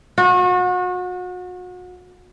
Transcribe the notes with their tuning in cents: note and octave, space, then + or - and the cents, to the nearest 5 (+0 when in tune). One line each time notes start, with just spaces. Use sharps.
F#4 -35